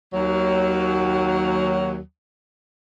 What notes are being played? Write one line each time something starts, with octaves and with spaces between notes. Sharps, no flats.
D#2 F#3